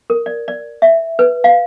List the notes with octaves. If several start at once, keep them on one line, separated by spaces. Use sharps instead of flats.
A#4
D5
D5
E5
B4
F5